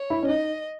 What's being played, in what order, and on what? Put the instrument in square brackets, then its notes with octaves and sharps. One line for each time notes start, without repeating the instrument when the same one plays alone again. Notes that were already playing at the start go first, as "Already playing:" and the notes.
Already playing: [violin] C#5
[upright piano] E4
C#4
[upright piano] D#4 [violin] D#5